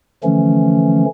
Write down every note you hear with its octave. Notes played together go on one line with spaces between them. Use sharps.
D3 E3 F3 A3 C#4